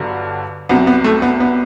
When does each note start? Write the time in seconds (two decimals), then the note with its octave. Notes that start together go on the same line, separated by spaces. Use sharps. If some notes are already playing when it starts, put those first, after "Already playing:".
Already playing: G1 G2 D3 F#3
0.69 C2 C3 F#3 B3
0.87 B3
1.04 A3
1.22 B3
1.40 B3